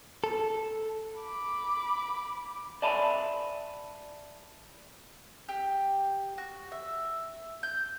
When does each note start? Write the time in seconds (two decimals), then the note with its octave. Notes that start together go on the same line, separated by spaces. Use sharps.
0.24 A4
1.20 B5 D6
2.82 D5 E5 G#5 A5 B5
5.49 G4
6.38 F#4
6.72 E5
7.63 G6